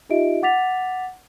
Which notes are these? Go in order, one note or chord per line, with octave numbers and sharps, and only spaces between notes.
D#4 F4 G4 D#5 E5 D7
F#5 D6 A6 B6 F7